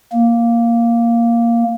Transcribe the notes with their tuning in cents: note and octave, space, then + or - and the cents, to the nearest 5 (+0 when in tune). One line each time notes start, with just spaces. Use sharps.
A#3 +0